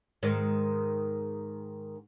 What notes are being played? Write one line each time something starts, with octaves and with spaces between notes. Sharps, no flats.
G#2 D#3